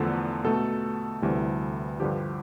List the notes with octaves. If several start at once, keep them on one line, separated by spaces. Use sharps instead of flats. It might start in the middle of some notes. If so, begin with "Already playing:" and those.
Already playing: E2 D3 F3 A3 A4
B2 A3 A4
D2 C3 E3 G3
G2 D3 F3 G4